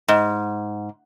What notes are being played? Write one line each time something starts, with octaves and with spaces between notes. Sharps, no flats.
G#2